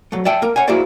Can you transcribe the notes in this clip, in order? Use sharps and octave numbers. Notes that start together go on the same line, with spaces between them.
F#3 A3
D5 E5 G5 A5
A#3 A#4
C#5 F#5 G#5
A#3 E4 F#4 G#4 C5 D5